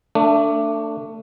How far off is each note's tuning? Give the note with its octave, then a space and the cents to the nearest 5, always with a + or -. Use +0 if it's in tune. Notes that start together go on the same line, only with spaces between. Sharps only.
A3 +25 D4 +0